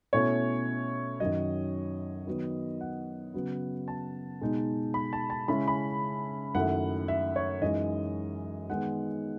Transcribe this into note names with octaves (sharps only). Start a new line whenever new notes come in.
B2 A3 C#4 E4 C#5
F#2 D#3 F#3 D#5
D#3 F#3 B3
F#5
C#3 F#3 B3
A5
B2 G#3 D#4
B5
A5
A5
C#3 G#3 C#4 E4 B5
B5
F#2 D#3 A3 E4 F#5
E5
C#5
F#2 E3 G#3 D#4 D#5
D#3 G#3 B3 D#4 F#5